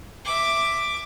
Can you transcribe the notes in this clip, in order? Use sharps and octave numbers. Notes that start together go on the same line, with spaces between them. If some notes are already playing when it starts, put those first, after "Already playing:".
E5 D6